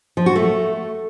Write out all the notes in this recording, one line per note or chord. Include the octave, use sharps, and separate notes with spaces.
F3
F#4
A3